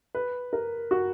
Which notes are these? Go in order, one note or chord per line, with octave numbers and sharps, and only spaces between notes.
B4
A#4
F#4